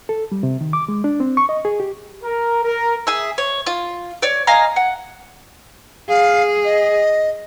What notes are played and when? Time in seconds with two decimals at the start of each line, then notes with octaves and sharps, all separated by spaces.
0.09 A4
0.32 G3
0.43 C3
0.61 D#3
0.73 D6
0.88 G#3
1.04 D4
1.20 C4
1.37 C#6
1.49 D#5
1.65 G#4
1.80 G4
2.24 A#4
2.63 A#4
3.07 G#4 E5
3.38 C#5
3.67 F4
4.22 C#5 D5
4.47 D#5 F5 G#5 A#5
4.76 F#5
6.09 G#4 F5
6.65 D#5